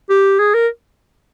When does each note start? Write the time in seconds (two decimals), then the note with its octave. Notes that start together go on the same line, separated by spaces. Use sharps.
0.10 G4
0.39 G#4
0.54 A#4